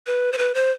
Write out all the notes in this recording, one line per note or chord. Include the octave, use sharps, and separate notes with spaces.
B4
C5
B4
C5